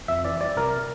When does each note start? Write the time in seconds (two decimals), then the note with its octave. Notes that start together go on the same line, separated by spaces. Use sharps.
0.08 F2 E5
0.24 E3 D5
0.40 G3 D5
0.57 C2 A#4